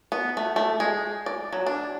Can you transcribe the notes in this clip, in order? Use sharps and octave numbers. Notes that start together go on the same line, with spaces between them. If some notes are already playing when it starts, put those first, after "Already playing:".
B3
A3
A3
G#3
D5
F#3
D4